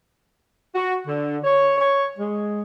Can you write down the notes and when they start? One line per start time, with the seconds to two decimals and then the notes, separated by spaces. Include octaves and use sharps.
0.75 F#4
1.06 D3
1.44 C#5
1.78 C#5
2.18 G#3